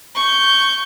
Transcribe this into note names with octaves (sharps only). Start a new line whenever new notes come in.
C#6 G6